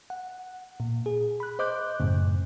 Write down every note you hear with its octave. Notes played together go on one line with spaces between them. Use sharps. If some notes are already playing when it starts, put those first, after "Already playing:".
F#5
A#2
G#4
B5 F#6
C5 D#5 D6 F#6 G6
F#2 A2 C#3